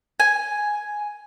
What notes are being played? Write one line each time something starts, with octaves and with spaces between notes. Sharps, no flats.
G#5